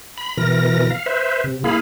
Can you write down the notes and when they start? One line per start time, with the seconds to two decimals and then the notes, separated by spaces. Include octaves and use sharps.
0.18 B5
0.37 B2 E3 A#4 A#6
0.90 F5
1.06 B4 C5 E5
1.44 C3
1.64 A#3 E4 G#4 F5 B5